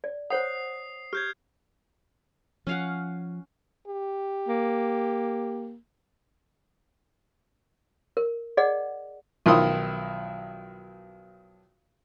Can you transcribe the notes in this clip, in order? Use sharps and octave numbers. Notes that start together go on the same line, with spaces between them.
D5
C5 C#5 F#5 D#6 C7
G4 F6 G6 G#6
F3 C#4 F5 F#5
G4
A#3
A#4
G#4 D5 D#5 F#5
B1 D#3 F3 E4 C6 D#6